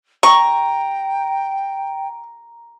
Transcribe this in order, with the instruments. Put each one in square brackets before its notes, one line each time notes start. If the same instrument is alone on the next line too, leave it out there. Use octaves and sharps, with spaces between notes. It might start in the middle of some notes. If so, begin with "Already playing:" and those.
[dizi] G5 [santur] A#5 [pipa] C#6